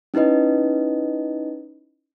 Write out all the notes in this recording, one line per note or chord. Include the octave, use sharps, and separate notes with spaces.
C#4 D#4 E4 B4 D#5